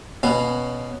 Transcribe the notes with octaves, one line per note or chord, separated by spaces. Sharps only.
B2 B3 C#4 F5